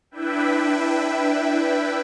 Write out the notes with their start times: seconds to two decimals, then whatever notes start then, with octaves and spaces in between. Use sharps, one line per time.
0.11 D4 E4 B4 E5 G5